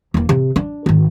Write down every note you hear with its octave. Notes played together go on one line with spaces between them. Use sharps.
E1 A#3
C3
D4
G#1 D#3